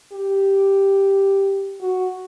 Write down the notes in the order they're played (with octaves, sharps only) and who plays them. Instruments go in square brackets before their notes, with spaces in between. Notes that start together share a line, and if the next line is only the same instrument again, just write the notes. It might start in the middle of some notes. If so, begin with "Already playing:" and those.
[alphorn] G4
F#4